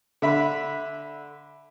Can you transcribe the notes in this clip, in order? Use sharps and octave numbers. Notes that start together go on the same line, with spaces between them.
D3 E5 B5